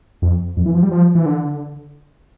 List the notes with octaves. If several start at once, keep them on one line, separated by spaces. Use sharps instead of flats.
F2
F2
E3
F3
G3
F3
E3
D3